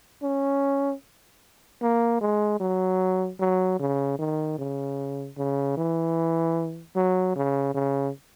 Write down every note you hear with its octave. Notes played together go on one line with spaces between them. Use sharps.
C#4
A#3
G#3
F#3
F#3
C#3
D#3
C#3
C#3
E3
F#3
C#3
C#3